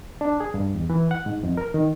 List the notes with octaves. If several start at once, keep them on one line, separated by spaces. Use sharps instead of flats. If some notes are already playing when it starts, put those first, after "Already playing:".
D4
G#4
G2
E2
E3
F#5
G#2
F2
A#4
D#3